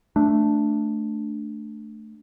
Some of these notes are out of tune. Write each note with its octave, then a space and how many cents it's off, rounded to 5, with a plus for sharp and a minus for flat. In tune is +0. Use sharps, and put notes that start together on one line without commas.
A3 +0 D4 +0